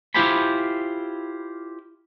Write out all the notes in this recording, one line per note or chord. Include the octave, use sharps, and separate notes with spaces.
E4 F4 G4 C5 G#5 B5